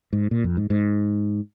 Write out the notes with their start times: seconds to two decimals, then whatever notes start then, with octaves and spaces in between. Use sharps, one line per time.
0.13 G#2
0.31 A#2
0.44 F2
0.57 G#2
0.70 G#2